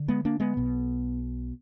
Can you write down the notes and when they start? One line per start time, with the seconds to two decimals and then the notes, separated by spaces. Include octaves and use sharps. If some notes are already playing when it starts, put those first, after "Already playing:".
Already playing: D3
0.08 G#3 B3
0.25 A#3 D4
0.40 G#3 B3
0.57 B1 B2